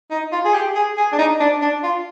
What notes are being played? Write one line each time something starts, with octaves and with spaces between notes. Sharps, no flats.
D#4
F4
G#4
G4
G#4
G#4
D4
D#4
D4
D4
F4